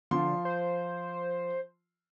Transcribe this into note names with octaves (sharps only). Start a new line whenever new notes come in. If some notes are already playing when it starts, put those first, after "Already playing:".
D3 F3 F4 C6
C5